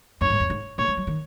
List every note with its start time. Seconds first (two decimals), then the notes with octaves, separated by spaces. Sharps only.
0.21 F#2 C#5
0.30 G#2
0.40 E2
0.50 G#2
0.78 A2 C#5
0.88 G#3
0.97 F#3
1.07 D#3